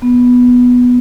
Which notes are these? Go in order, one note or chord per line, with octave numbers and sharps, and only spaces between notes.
B3